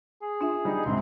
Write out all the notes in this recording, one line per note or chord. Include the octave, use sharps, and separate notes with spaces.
G#4
D4 F4 E5
G3 D#4
C#2 G#2 C3 C4